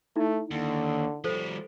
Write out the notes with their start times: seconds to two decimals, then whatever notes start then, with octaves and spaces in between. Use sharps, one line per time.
0.16 A3 D#4 E4
0.51 D#2 D3
1.24 F3 G3 A4 C5